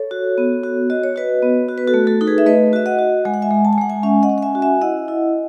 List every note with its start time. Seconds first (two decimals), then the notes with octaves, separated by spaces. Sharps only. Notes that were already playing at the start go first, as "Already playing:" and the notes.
Already playing: A4 C#5
0.11 F#4
0.38 B3
0.63 F#4
0.90 F#4 D#5
1.04 C#5
1.16 F#4 B4 D#5
1.42 B3
1.69 F#4
1.78 B4
1.87 F#4 A4
1.94 A3
2.07 F#4 A4
2.21 D#4 A4
2.27 G#4 B4
2.38 E5
2.46 A3 B4 D#5
2.73 F#4 E5
2.86 D#5 F#5
2.99 F#4
3.25 G#3 G#5
3.34 F#5
3.42 E5 G#5
3.51 G#3
3.65 A5
3.73 G#5
3.78 G#3 F#5
3.89 E5 G#5
4.03 C#4 E5 G#5
4.23 D#5 F#5
4.29 C#4
4.38 F#5
4.42 E5 G#5
4.55 F#4
4.62 E5 G#5
4.81 E4 D#5 F#5
5.08 E4